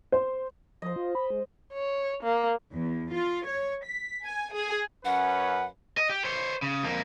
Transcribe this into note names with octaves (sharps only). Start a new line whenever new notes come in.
C5
F3 C5 D#5
F4
B5
G#3
C#5
A#3
E2
F4
C#5
B6
G#5
G#4
F#2 C#4 B4 F#5
D#5
G4
C5 C#5
C#3
F2 A#3